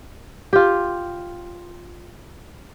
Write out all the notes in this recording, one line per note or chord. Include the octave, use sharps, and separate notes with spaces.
F4 G4